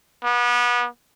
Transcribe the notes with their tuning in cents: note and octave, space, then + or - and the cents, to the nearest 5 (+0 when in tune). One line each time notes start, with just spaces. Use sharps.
B3 -30